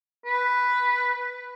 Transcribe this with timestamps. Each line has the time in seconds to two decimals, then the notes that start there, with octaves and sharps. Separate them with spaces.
0.25 B4